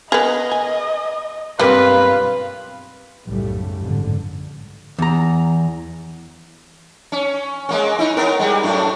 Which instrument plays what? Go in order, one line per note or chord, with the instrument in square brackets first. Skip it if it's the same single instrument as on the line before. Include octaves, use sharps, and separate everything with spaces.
[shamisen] B3 G#4 [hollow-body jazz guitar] A#4 [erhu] D#5
[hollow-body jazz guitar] G#5
[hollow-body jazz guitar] B1 G2 C4 [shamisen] G3 A#3 [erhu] F4 [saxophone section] B4
[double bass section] B1 F#2 A2 C#3 G3 A3
A1 F2 G#2 D3
[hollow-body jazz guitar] E2 A#5
[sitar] C#4
G#3 A#3 C#4
D#4 E4
B3 C#4 A#4
G3 G#3
F#2 A2 D4